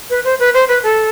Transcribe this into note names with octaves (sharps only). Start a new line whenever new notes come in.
B4
C5
B4
C5
B4
A4